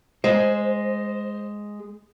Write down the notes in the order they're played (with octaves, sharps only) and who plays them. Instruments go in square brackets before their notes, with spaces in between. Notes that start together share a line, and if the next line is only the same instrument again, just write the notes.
[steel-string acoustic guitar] G#3 [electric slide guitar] C5